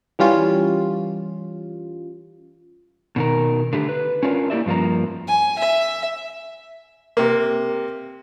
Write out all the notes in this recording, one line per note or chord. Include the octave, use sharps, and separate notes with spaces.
E3 G3 C#4 F4
B2 D#3 A#4
D3 A3 G4
B4
C#4 D4 F4 G4 A#4
A#3 E4 G4 D5 E5
G2 F3 A#3 A#5
G#5
E5
C3 A#3